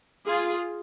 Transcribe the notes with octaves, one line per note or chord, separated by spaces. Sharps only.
F4 G#4